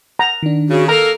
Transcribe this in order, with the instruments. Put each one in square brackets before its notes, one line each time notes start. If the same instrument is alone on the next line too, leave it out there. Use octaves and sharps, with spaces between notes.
[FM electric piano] F#5 [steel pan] A#5
[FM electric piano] D#3 D4
[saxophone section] C#3 [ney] F#4
[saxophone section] A#3 A#4 [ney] A4 [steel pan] A#5